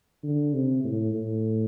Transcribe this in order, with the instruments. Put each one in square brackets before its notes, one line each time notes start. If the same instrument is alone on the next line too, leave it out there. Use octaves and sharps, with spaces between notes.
[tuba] D3
C3
A2
A2